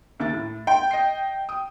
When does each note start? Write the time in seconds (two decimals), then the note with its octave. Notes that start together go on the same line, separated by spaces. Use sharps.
0.20 D#2 E5 A6
0.33 A2
0.67 G5 C6
0.91 D#5 C7
1.49 D#6